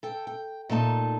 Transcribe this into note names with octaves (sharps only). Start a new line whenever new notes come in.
A4 G5
G5
A#2 A3 D#4 A5